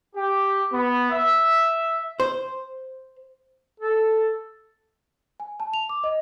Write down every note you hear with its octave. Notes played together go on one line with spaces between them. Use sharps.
G4
B3
E5
C5
A4
G#5
A5
F7
D6
D#5